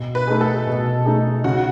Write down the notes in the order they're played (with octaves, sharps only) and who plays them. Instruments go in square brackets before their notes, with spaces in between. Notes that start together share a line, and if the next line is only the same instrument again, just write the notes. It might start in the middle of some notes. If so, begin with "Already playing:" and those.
Already playing: [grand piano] B2
[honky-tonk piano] B4
[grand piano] A3 D#4 G#4
[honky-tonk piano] A4
[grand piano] B2
A3 D#4 G#4
[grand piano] C#3 [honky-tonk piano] F#4